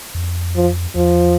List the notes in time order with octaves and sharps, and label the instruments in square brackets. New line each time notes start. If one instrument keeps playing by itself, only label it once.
[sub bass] F2
[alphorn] F3
[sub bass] E2 [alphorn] F3